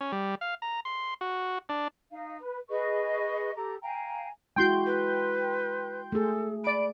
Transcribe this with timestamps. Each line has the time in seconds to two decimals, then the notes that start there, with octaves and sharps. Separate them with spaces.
0.01 C#4
0.12 G3
0.41 F5
0.62 A#5
0.85 C6
1.21 F#4
1.69 D4
2.11 D#4 F5
2.39 B4
2.69 G#4 B4 D#5 C#6
3.55 G4 A4 A#5
3.82 F5 G5 G#5 A#5
4.56 G#3 E4 F#4 G5 C6 G6
4.86 B4
6.12 A3 G#4 A4
6.64 D5 B5 D7